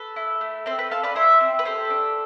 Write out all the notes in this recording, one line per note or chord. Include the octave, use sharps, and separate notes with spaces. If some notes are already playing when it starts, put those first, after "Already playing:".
Already playing: A4 B4
E4
A3
C4 A4 C5
B4
A4 F5 A5
B4 D5
E4 C5 E5
C4
B4
G4 A4 C5
D4